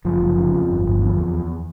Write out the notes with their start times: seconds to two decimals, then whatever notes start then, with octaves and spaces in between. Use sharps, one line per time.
0.05 F#1 F3
0.21 F#1
0.37 C#3
0.53 F2
0.69 G1
0.85 G1
1.01 E2
1.17 E2
1.34 E2